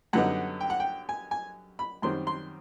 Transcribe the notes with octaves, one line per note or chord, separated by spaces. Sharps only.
F#2 D3 G3 B3 D#4 F#5
G5
F#5
G5
G#5
G#5
B5
F#2 D#3 G3 C4 C6
C6